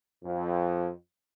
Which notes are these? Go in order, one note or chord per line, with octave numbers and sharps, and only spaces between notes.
F2